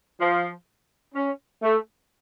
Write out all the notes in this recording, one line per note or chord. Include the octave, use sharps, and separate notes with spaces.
F3
C#4
A3